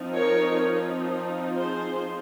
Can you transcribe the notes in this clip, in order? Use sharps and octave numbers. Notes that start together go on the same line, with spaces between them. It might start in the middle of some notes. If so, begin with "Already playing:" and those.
Already playing: F3 C4 D#4
A#4 C#5
G#4 C5